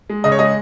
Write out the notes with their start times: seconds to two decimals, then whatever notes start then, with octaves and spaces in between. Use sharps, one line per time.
0.10 G#3
0.24 C#3 D#5
0.32 C#5
0.39 G#3 D#5